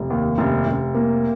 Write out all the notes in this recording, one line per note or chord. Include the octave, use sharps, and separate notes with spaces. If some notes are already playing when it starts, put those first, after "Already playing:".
Already playing: F1
D#2
F1
F1
A#3